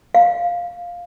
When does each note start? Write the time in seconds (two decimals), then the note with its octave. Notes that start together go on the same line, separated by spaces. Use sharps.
0.15 F5